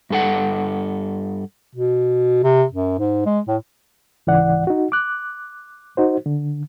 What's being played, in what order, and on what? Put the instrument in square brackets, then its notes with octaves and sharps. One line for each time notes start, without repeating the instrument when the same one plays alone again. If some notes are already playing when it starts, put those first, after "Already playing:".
[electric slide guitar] G2 A4 F#5
[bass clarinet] B2
C3
F#2
G#2
G#3
A2
[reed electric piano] C#2 G#2 E3 D5 F#5
D#4 F#4
D6 F#6
D#4 F#4 C5
D3